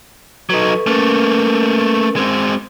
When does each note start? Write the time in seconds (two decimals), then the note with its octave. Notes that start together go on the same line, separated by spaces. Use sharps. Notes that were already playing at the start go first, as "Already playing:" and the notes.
0.50 F#3 D#4 A4 B4 C#6
0.87 A3 A#3 C#4 A#4 B4
2.16 G#3 C4